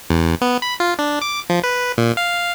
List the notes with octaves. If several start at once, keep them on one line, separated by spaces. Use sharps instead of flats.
E2
B3
B5
F4
D4
D6
F3
B4
A#2
F5